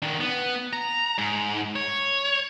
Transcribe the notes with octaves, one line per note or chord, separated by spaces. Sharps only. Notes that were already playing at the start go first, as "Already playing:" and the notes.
D#3 D4
B3
A#5
G#2
C#5